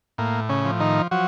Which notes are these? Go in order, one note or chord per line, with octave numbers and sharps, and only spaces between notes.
A2 A#3
C#3 C#4
F3
D#3 D#4
F3 F#3 F#4